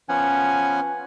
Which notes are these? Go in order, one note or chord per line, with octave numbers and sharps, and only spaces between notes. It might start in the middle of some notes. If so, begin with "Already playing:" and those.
F3 B3 C#4 F#5 G#5